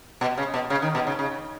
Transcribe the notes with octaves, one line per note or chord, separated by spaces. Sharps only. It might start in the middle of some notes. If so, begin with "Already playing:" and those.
B2
C#3
B2
C#3
D#3
B2
C#3
C#3